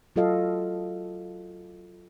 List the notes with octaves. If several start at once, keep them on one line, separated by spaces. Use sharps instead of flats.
F#3 F4 F#4 A4 D#5 F5